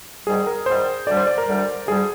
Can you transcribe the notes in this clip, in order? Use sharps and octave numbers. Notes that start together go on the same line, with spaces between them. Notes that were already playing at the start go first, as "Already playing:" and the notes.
G#2 D#3 G3 G#4
A#4
G#2 D#3 G3 C5
D2 D3 G3 D5
C5
D5
A#4
D2 D3 G3
D2 D3 G3 G#4